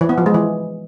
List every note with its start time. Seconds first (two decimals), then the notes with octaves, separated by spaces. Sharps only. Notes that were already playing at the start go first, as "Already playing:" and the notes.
0.01 E3
0.09 B3
0.18 F3
0.26 G#3
0.34 E3